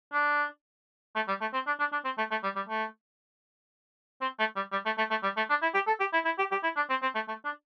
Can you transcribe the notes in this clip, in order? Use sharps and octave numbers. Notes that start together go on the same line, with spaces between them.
D4
A3
G3
A3
C4
D4
D4
D4
C4
A3
A3
G3
G3
A3
C4
A3
G3
G3
A3
A3
A3
G3
A3
D4
E4
G4
A4
G4
E4
E4
G4
G4
E4
D4
C4
C4
A3
A3
D4